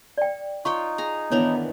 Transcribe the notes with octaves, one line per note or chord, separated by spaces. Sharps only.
D5 G5
D#4 F4 C#5 G5 C#6
G#4 A#5
D#3 E3 B3 D4 C#5 A#5